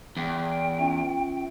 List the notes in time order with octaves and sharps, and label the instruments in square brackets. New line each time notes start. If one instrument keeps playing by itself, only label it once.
[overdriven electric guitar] E2 [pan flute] G5
[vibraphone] C#4 F4 E5